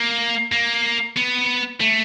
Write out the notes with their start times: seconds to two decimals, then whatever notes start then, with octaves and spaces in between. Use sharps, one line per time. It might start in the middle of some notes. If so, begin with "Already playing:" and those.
Already playing: A#3
0.52 A#3
1.16 B3
1.80 A3